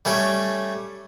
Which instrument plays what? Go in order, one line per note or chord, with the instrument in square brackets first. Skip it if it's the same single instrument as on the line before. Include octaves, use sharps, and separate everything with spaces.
[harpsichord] G3 A3 C#4 G4